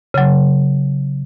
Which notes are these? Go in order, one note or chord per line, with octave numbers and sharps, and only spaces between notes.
C#3 F#3